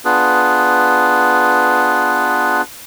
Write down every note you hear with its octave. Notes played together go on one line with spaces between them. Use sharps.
B3 D4 F4 G#4 B4